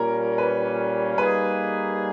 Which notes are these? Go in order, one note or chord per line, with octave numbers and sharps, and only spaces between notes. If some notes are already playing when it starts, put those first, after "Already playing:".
Already playing: A#2 G3 A#3 C#4 A#4
B4
G3 A#3 D#4 G#4 B4